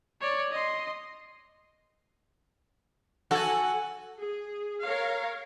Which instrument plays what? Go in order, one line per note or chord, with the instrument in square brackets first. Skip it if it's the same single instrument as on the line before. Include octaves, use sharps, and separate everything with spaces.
[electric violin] C#5 D5
D#5 C6
[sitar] F#4 A4 [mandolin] F#5 G#5
[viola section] G#4
A#4 C#5 F5